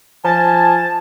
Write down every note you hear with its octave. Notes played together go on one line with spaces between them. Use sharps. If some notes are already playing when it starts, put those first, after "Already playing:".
F3 G#5 A5